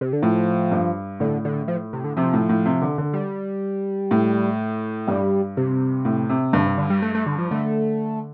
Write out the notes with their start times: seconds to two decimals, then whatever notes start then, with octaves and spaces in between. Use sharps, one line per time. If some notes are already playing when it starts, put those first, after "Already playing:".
0.01 C3
0.13 D3
0.22 A2 F3
0.72 G2
1.20 A2 D3
1.45 D3
1.68 F3
1.93 C3
2.04 D3
2.17 C3 F3
2.33 A2
2.49 A2
2.65 C3
2.82 D3
2.98 D3
3.13 G3
4.11 A2
5.07 G2 G3
5.57 C3
6.05 A2
6.29 C3
6.53 G2 D3
6.66 C3
6.78 D3
6.90 G3
7.02 A3
7.15 A3
7.26 D3
7.38 F3
7.51 D3 A3